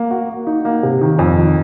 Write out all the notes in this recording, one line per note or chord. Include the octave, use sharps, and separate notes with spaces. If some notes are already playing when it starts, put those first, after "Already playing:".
Already playing: A#3
F#4
A#3
D#4
A#3
C3
D#3
F2
D#3